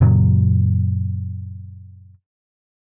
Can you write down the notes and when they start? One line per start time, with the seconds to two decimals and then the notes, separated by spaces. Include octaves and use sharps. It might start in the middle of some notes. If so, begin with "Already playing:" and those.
0.01 F#2 A#2 C#3 F#3